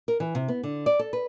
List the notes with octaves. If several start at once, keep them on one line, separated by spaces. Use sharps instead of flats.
A#4
E3
C3
B3
D3
D5
A4
B4